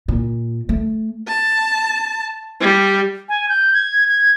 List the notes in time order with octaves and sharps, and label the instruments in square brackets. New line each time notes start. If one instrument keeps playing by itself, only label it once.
[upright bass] A#2
A3
[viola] A5
G3
[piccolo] G#5
G6
G#6
G#6